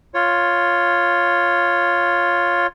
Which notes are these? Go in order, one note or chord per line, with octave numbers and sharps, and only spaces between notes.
F4 C#5